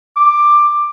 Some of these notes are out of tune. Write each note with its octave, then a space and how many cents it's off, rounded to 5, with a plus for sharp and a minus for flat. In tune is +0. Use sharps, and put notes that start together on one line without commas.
D6 +10